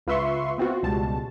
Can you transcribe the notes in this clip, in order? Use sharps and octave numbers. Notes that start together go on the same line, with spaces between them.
C#2 F4 B4 E5 C6 C#6
B3 C4 F4 F#4
C#2 B2 G3 G#3 A5